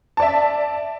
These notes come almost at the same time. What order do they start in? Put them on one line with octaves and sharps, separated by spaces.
A5 D5 E5